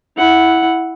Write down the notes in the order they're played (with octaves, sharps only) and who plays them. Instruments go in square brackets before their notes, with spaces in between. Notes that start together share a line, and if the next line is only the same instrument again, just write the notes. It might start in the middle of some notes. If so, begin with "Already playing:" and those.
[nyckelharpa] E4 F#5